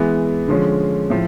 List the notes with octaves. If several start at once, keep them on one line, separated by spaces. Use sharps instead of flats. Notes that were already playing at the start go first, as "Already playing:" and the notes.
Already playing: E3 G#3 B3
D3 F3 G#3 C#4
A2 F3